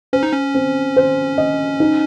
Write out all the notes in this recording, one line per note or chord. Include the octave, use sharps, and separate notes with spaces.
C#4 C5
D#4
C#4
C4
C5
D#5
D#4